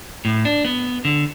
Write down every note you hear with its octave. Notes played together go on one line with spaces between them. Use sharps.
A2
D4
B3
D3